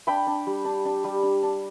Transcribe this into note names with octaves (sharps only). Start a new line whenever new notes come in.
D4 G5 B5
D4
G3
D4
D4
G3
D4
D4